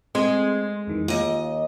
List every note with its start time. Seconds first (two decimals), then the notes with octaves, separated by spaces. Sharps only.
0.15 G#3 C4 G#4 C6 G#6
0.87 F2 D#3 E3
1.08 D#2 F4 D#5